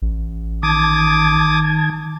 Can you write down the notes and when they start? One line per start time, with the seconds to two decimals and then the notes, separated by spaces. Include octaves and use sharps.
0.02 A1
0.63 D#3 A5 D6 D#6 G#6